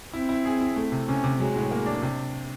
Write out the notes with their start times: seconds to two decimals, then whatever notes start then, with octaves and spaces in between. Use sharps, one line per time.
0.13 C4 E4
0.29 E4
0.45 G#4
0.61 E4
0.76 A3
0.92 C3
1.08 C3 C#4
1.24 C3
1.40 F#3 G#3
1.56 A2
1.71 A#3
1.86 D4
2.02 C3